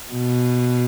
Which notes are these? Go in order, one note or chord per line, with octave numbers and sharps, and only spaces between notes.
B2